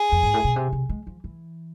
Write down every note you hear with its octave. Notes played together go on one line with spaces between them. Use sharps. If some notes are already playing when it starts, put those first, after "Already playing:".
Already playing: G#4
F2
G#2
A2
B2
C3
C3
G#3
F3
E3